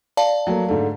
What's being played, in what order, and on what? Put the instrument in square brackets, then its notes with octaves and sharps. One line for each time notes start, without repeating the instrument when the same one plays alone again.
[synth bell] D5 F5 A5
[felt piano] F#3 A3 A#3
G#2 D3 A3